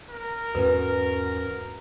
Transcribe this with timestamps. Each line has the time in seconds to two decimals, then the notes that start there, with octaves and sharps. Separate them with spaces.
0.10 A#4
0.55 E2 G#2 C#4 F#4 B4